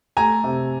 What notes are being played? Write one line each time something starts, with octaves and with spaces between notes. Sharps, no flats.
A3 G#5 A#5
C3